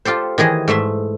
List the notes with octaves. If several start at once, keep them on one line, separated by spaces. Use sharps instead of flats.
F4 G4 A4 C5
D#3 E3 G#4 D#5
G#2 A3 E5 C6